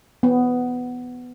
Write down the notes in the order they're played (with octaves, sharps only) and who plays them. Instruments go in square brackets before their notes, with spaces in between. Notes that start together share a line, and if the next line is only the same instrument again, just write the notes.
[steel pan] B3